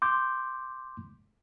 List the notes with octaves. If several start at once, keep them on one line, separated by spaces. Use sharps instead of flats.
C6 D6 G6